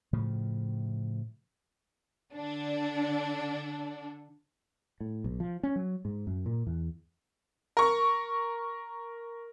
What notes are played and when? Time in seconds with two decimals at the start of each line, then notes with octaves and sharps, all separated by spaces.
0.13 A2 C#3 F3
2.32 D3 D4
5.00 A2
5.24 B1
5.40 F3
5.63 C#4
5.76 F#3
6.05 G#2
6.27 F#2
6.46 A#2
6.67 E2
7.77 A#4 C#6